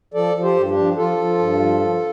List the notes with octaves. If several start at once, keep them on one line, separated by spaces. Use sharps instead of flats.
F3 A4 D5
F3
G4 C5
G2
D4 G4
F3
F3 F4 A4
F3
G2
F3
F3